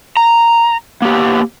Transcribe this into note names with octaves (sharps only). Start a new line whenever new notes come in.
A#5
A#3 B3 G4